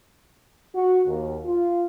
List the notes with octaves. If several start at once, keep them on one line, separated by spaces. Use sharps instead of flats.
F#4
D#2
F4